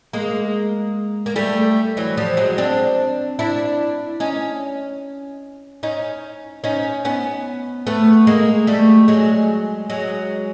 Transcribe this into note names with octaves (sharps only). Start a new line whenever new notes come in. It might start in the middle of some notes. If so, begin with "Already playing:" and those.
G#3 A#3
A#3
G3 A3
E3 F#3
F3 G3
F#3 G#3
C4 D4
D4 E4
C#4 D#4
C#4 D#4
C#4 D#4
B3 C#4
A3 B3
G#3 A#3
G3 A3
F#3 G#3
F#3 G#3